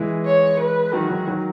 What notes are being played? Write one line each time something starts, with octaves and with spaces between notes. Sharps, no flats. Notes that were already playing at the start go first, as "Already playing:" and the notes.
Already playing: E3 G#3
C#5
B4
D#3 F#3 F#4
D#3 F#3
D#3 F#3